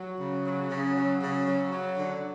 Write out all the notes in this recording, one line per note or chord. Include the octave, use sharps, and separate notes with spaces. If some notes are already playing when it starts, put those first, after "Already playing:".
Already playing: F#3
C#3
F#3
C#3
F#3
C#3
F#3
F#3
D3